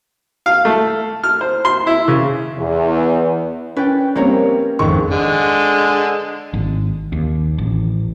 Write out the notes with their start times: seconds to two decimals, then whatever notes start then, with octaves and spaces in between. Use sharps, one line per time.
0.46 F5
0.65 A3
1.24 F6
1.41 C5
1.65 C6
1.87 E4
2.08 C#3
2.59 E2
3.76 C#4 B4 D5 G5
4.15 G3 A#3 C4 C#4 C#5 A#5
4.79 G#1 F2 D#3 A#3 C#6
5.11 D3 G#3
6.53 G#1
7.12 D#2
7.58 A1